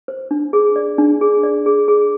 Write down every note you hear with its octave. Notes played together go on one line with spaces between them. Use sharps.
C5
D4
G#4
D5
D4
G#4
D5
G#4
G#4